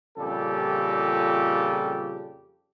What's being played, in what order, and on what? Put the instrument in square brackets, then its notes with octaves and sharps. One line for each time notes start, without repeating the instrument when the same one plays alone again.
[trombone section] F2 A#2 C#3 G3 G4 A4